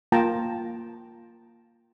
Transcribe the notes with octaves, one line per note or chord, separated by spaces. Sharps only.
A#3 F4 G5 A5 A#5